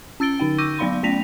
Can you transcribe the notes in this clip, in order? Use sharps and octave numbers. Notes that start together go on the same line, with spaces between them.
C#4 E6 A6 D7 G7
D3 D#4 G5
C#6 D6 E6 G6 A#6 D#7
F#3 B3 D5 F5 B5 C6
A3 C#4 G5 A#6 B6 F7